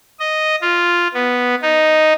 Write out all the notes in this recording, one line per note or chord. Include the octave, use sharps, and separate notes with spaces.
D#5
F4
B3
D#4